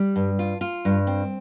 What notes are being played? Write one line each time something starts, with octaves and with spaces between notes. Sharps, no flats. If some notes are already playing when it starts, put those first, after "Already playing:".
Already playing: G3
G2
F4
F4
G2
C4